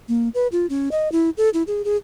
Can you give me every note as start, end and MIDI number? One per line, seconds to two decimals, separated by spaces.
0.08 0.29 58
0.34 0.47 71
0.52 0.66 65
0.69 0.89 61
0.91 1.11 75
1.12 1.30 64
1.37 1.49 69
1.54 1.63 64
1.67 1.82 68
1.85 1.96 68